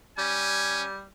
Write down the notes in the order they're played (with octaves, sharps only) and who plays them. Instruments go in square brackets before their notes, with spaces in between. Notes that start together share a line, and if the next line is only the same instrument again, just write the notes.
[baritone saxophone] G3 [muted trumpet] C#4 [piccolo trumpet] G#5